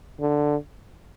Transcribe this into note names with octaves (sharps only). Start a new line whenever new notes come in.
D3